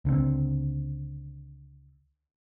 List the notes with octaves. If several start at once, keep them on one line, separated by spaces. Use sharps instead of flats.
C#2 D3 F#3 C4